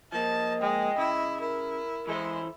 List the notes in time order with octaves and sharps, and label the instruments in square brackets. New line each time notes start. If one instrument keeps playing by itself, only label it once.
[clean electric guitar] F3 A#3 [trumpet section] D#5 [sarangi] A5
[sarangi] G#3 [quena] G5
[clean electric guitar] C#3 [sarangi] E4
[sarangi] E4 [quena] A#4
[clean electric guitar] E3 A4 C5 [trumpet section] G#3 [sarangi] E4